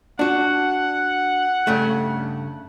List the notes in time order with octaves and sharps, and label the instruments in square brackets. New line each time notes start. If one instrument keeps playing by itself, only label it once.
[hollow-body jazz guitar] D4 F#4 [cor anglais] F#5
[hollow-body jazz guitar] G2 C#3 A3